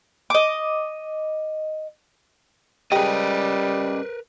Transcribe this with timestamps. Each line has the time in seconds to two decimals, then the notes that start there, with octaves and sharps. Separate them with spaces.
0.30 D#5 D6
2.92 G3 G#3 C#4 G4 A#4 B4 D#5